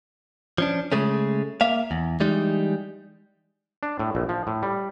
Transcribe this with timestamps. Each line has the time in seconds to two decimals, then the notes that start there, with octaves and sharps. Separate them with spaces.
0.58 F3 C#4 D4
0.92 C#3 G#3 A3 C#4
1.61 A#3 E5 F5
1.91 E2
2.20 E3 G3 G#3 D#4
3.83 D4
3.99 A2
4.15 A#1
4.29 F3
4.47 A2
4.63 G3